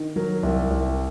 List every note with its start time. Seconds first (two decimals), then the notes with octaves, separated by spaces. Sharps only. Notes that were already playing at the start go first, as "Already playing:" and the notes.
Already playing: D#3
0.16 F#3 A#4
0.43 C2
0.70 C2